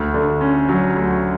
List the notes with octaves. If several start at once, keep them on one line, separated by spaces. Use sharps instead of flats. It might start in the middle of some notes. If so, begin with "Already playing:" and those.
Already playing: D2
D3
C#4
F#3
D2